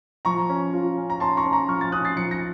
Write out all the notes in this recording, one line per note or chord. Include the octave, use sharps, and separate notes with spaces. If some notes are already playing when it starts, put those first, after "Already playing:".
F3 A#5 C#6
C#4
F4
C#4
A#5
C#4 A5 C6
A#5 C#6
C#4
A#5 C#6
F3 C#6 F6
A6
C#4 D#6 F#6
A6 C7
F3 C#7
A#6 C#7